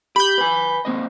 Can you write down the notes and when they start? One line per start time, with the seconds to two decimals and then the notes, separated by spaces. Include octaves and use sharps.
0.16 G4 B5 G6
0.38 B4 G#5
0.85 A#3 C4 D#5